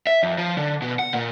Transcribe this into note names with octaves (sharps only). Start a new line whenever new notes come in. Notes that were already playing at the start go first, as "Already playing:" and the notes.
E5
F2
F3
D3
B2
F#5
A#2